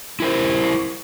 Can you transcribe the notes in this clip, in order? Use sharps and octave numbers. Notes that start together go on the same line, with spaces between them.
E4 A#4 C5